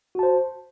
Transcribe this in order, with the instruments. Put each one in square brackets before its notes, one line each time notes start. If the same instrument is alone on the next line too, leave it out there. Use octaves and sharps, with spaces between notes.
[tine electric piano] F#4
A5
C5